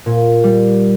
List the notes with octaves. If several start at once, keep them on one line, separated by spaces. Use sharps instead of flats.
A#2
G3